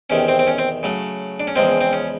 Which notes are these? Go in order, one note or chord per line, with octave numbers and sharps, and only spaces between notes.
E2 C3 D#3 C#4
C4
C4
C#4
C4
C#3 F#3 A3
D4
C#4
E2 C#3 F3 G#3 C4
C4
C#4